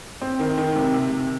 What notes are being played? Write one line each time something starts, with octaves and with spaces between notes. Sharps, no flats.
C4
D#3
D#3
C3
C3
C3